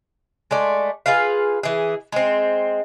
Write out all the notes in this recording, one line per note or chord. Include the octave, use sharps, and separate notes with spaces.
G#3 A3 D5
F4 G#4 B4 F5
E3 G#4
G#3 C4